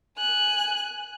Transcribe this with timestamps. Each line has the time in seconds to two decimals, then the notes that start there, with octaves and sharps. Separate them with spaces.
0.18 G#5 F#6